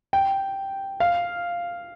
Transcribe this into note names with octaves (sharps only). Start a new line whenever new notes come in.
G5
F5